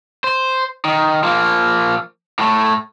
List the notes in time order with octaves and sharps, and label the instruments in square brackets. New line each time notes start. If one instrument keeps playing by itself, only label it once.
[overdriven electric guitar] C5
D#3
F3 A#3
A2 A3